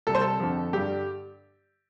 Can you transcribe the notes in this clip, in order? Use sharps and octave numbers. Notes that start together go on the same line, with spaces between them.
C2 C3 G3 A4
C5
A4
F2 D3 F3
G2 D3 G3 G4